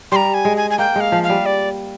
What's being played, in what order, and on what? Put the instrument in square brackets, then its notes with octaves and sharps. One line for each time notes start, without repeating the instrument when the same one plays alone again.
[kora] G3 [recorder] A#5 C6
[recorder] G#5
[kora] G#3
[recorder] G#5
G#5
[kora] A#3 [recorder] G5
[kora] G#3 [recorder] F5
[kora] F3
[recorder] F5
[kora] G3
[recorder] D5